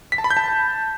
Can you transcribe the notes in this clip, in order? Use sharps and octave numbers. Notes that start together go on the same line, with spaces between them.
B6
A5
B5
G6
A5